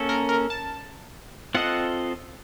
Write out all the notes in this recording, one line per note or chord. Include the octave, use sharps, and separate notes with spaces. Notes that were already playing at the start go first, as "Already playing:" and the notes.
Already playing: A#3 C#4 A4
A#4
A#4
A5
C4 F4 A4 D#5 F#5